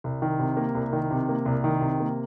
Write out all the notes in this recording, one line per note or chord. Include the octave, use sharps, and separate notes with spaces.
C2
D#3
C3
A#3
C2
D#3
C3
A#3
C2
D#3
C3
A#3